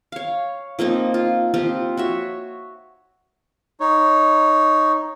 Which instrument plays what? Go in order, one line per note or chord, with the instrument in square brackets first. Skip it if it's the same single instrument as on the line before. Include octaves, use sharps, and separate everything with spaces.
[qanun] C#5 F5
F3 A#3 C4 D#4
F4
F3 C4 F4 G4
F#4 C#5 E5
[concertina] D#4 C#5